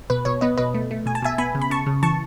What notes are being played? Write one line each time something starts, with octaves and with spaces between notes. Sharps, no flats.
B2 B4
B2 C#5
B3 B4 D#5
B2 B4 D#5
A3
A3
B2 G#5
A5
B2 E5 G#5
B3 G#5 B5
C#3
B5
C#3 A5 C#6
C#3
E3 A5 C#6